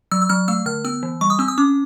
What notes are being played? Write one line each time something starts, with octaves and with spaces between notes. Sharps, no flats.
F#3 E6
E6
F#3 F6
A3 E6
D3 F6
B3 E6
E3
G3 C#6
D#6
C4 E6
D#6
C#4 D6